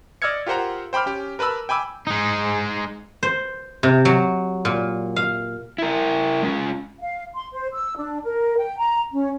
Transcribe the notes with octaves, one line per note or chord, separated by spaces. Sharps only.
D5 D#5 E6 F6 G#6 C#7
F4 G4 A#4 C5 F#5 A#5
C5 G5 B5 D6 F6
C#4 G4 G5
A#4 B4 A5 B5 E6
G5 G#5 B5 D6 E6
G#3 D#4
C5
C3
F#3
A#2
F5
E4 A#4
G#3 C#4 F4
F5
C6
C5
E6
D4
A#4
G5
A#5
C#4